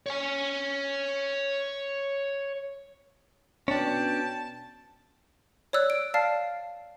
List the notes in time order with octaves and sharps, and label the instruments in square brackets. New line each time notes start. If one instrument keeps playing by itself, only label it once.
[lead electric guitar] C#5 G#5
[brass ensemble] B2 B3 G5 [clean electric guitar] C#4 D4 [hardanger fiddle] A5
[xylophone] C#5 D5 E6 F#6
D7
D5 F5 A5 F6 C7